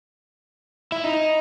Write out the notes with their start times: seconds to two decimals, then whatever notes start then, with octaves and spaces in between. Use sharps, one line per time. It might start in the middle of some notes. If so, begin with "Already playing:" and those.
0.92 E4
1.04 D#4